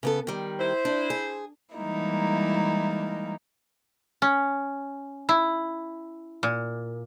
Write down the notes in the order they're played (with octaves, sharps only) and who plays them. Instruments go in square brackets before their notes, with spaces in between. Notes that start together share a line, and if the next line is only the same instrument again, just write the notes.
[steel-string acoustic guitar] C#3 B3 A4
D#3 G3
[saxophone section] E4 C5
[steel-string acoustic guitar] D4
G#4
[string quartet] E3 G3 G#3 A#3 D#4 E4
[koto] C#4
E4
A#2